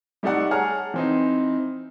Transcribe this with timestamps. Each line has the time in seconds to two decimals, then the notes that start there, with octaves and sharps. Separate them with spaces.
0.23 G3 A3 D#4 A4 D5 F#5
0.51 G#4 C#5 F#5 A5 A#5 F6
0.94 E3 C4 D#4